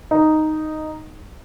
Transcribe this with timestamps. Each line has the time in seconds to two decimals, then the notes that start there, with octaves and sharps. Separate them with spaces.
0.11 D#4